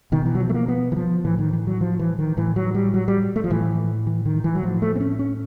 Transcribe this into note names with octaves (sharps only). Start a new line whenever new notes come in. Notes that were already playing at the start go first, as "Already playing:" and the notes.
B2 D#3
E3
F#3
F3
A3
A#3
B3
E3
F3
A2 E3
D#3
E3
F#3
F3
E3
D#3
A2 E3
F#3
G3
F#3
G3
A3
F3
A2 E3
E3
D#3
E3
F#3
A2 F3
A3
C4
C#4
C#4